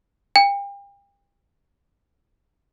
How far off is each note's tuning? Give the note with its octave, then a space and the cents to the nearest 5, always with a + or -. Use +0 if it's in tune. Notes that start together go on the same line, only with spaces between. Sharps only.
G5 +35